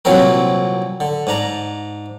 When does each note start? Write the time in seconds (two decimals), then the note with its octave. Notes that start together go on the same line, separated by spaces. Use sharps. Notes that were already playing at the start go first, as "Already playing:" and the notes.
0.05 C2 A#2 E3 F#3 C4 A#4
1.00 D3
1.27 G#2 D4 A#5